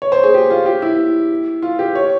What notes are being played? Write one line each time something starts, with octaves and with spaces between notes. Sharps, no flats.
C#5
C5
G#4
G4
F4
G4
E4
F4
G4
C#5